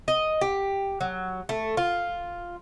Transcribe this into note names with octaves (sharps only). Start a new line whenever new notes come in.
D#5
G4
F#3
A3
F4